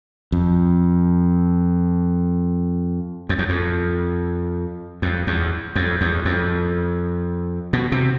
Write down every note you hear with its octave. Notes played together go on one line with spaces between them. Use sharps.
F2
F2
E2
F2
F2
E2
F2
E2
F2
B2
C3